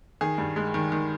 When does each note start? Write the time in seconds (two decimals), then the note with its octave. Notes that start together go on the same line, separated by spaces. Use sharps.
0.21 D#3 G#4
0.38 G2
0.56 G#3
0.74 D#3
0.92 D#3